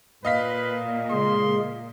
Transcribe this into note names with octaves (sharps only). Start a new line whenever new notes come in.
A#2 B4 D#5 F5 B6
C#3 G#3 G#4 C6